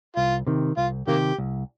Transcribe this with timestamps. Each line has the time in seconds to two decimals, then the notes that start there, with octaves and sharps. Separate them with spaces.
0.16 C2 F4
0.47 C3 D#3
0.77 C2 F4
1.07 C3 D#3 A#3 G4
1.38 C2